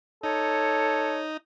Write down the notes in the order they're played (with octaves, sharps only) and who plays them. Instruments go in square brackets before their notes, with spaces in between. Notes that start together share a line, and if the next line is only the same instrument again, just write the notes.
[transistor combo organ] D#4 [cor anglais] A4 [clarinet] C#5